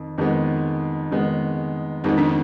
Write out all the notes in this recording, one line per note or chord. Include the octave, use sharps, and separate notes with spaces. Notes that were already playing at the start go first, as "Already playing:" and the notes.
Already playing: F2 D#3
F2 D#3 G#3 B3
F2 D#3 G#3 B3
F2 D#3 G#3 B3 D#4
D4